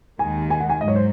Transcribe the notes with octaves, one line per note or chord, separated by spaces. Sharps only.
D#2 D#3 G#3 G#5
G#5
F#5
G#5
G#2 F#3 D#5
C#5
C5